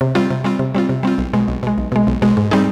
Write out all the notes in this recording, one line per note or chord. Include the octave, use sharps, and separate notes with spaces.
C3
G3 C4 F4
C3
G3 C4 F4
C3
G3 C4 F4
C3
G3 C4 F4
B1
B2 G#3
B1
B2 G#3
B1
B2 G#3
B1
B2 G#3
G#2
G3 C4 D#4 G#4